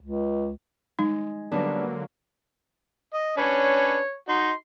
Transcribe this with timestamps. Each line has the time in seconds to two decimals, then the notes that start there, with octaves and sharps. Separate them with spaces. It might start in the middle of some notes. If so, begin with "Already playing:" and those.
0.02 C#2
0.99 G#3 D#4
1.52 D3 F#3 G3 A#3 B3 D4
3.14 D#5
3.38 C#4 D4 B4 C#5
4.29 D#4 F#4 C6